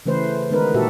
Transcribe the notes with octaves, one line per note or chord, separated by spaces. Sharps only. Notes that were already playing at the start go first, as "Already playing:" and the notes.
C#3 E3 A3 B4 C5
D#3 G#3 B3 D#4 A#4 B4
A#2 F#4 G4 A4 E5